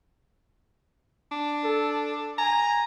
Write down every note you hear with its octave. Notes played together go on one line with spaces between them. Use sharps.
D4
A4
G#5 A#5